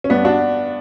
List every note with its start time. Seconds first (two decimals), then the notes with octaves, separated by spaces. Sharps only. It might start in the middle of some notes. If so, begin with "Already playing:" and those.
0.04 C#4
0.10 G2 B3 D4
0.25 D4 F#4